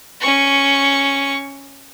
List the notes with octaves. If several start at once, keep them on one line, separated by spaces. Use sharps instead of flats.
C#4 C#6